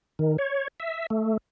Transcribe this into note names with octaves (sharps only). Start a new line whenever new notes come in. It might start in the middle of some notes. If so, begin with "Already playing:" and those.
D#3
C#5
E5
A3